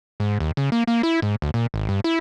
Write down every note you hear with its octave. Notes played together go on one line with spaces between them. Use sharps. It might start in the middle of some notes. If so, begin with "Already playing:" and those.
G#2
D#2
C#3
A#3
A#3
E4
G#2
D2
A#2
G#1
G2
E4